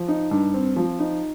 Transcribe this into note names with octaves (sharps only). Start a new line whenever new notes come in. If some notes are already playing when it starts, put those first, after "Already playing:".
Already playing: F3
D#4
G2
C4
F3
D#4